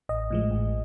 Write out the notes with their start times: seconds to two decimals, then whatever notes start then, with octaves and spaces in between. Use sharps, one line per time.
0.09 A1 D#5
0.31 A2 F3 G#3
0.51 A1